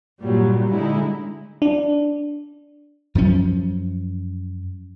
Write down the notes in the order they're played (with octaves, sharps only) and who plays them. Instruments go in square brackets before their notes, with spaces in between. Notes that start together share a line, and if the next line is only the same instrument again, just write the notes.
[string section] G2 A#2 F#3 G3
D3 G#3 D#4 E4
[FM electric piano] D4
[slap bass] F#2 F3 C#4